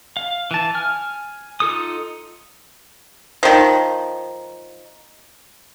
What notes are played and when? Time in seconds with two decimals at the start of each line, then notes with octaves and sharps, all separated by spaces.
0.17 F5
0.51 E3 A5
0.74 G#5 F6
1.60 D#4 F4 A4 D#6
3.43 D#3 F3